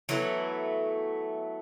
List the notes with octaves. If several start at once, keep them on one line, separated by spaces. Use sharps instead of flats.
E3 F#3 A3 B3